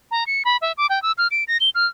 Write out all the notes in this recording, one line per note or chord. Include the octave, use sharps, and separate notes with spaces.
A#5
C#7
B5
E5
D6
G5
E6
F6
D7
A#6
G7
F6